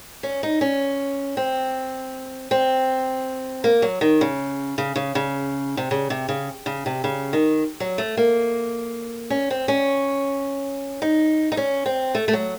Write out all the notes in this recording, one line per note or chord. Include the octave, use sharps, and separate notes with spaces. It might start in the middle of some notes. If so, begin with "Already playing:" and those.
C#4
D#4
C#4
C4
C4
A#3
F#3
D#3
C#3
C#3
C#3
C#3
C3
C#3
C3
C#3
C#3
C3
C#3
D#3
F#3
A3
A#3
C#4
C4
C#4
D#4
D#4
C#4
C4
A3
A3
F#3